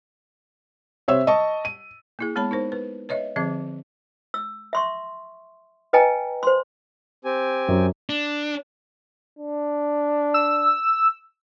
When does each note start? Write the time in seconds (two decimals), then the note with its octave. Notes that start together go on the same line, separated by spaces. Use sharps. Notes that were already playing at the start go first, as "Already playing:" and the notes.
1.08 C3 C5 C#5 E5 E6
1.27 D#5 A5 C#6
1.65 D#7
2.19 A#3 E4 G#4
2.36 G#3 B3 C#5 A5 B5
2.51 D#4 A#4 C5
2.72 B4
3.09 B4 C#5 D#5 E5
3.36 D3 F3 C4 G#4 E5
4.34 E6
4.73 E5 C6 C#6
5.93 B4 D#5 G5 G#5 A#5
6.43 C5 C6
7.25 C4 G4 G#5
7.68 F#2
8.09 D4
9.39 D4
10.34 E6